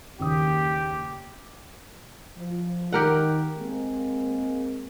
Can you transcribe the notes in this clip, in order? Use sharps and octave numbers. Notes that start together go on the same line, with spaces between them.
F#1 D#2 G4 D#6
F3
D#3 G4 A#4 F#5
G#3 A#3 C4